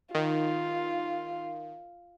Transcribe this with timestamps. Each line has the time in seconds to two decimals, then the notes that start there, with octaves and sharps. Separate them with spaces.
0.15 D#3 F4